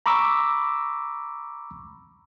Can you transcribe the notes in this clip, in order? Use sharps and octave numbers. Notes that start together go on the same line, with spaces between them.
A#5 B5 C#6 D6 E6